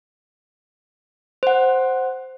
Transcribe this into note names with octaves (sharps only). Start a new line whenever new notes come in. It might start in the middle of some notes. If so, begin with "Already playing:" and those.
C5 F#5